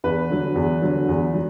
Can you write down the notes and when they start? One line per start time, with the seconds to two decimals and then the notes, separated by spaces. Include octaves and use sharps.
0.04 E2 B4
0.29 D3 F#3
0.55 E2
0.82 D3 F#3
1.08 E2
1.34 F#3